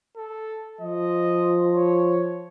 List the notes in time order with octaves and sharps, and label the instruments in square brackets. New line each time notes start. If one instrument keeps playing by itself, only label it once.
[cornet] A4
[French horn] F3 [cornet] D#5
[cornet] C#5